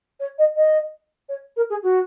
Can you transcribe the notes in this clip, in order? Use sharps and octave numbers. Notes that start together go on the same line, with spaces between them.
C#5
D#5
D#5
C#5
A#4
G#4
F#4